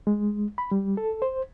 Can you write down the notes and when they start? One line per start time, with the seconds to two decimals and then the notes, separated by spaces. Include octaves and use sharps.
0.07 G#3
0.58 B5
0.71 G3
0.97 A4
1.22 C5